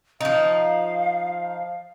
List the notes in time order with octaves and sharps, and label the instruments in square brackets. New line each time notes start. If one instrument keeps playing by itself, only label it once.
[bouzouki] F3 D#4 [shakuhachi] F5